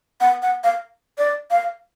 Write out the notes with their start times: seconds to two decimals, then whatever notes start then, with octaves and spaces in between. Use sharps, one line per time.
0.21 F#5
0.42 F#5
0.64 F5
1.18 D5
1.51 F5